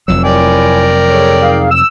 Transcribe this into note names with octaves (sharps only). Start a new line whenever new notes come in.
F1 F2 F#3 E6
E4 A#4 C#5 D5 G5 G#5
G#4 A4 C#5
D#4 G#4 F5
E6